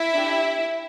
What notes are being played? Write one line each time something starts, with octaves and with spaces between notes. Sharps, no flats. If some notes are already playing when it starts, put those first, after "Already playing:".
Already playing: E4 E5
D4 G4